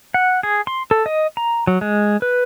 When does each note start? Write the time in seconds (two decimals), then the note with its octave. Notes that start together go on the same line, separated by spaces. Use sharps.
0.14 F#5
0.43 G#4
0.67 C6
0.91 A4
1.06 D#5
1.37 A#5
1.67 F#3
1.81 G#3
2.22 B4